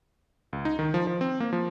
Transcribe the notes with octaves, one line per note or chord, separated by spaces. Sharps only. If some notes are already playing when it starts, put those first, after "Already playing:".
C#2
D#4
D#3
F3
F3
C4
A#3
F3